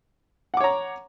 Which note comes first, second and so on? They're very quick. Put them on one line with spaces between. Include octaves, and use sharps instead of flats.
F#5 D6 C#5 A#5